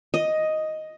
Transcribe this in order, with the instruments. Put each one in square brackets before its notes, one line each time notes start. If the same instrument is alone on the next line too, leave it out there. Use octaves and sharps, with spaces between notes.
[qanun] D#5